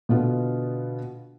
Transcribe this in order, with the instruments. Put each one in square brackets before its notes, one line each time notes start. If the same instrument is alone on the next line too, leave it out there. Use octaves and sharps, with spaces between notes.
[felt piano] B2 D3 B3 F4